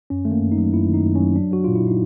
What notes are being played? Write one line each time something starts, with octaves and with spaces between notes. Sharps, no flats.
F#2 C#4
D#3 A3
A#3
F#2
D#4
F#3
F#2 E4
D#3 D#4
F#2
F#3 C#4
F#3 D4
F#3 F#4
A#2 F4
E4
A#2 D#4